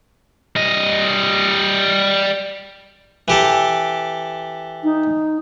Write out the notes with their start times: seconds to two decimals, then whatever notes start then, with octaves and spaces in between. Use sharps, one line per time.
0.56 G3 D#5
3.28 E3 G4 A4
4.84 D#4